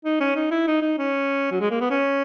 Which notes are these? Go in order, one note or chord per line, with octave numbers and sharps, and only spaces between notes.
D#4
C#4
D#4
E4
D#4
D#4
C#4
F#3
G#3
A#3
B3
C#4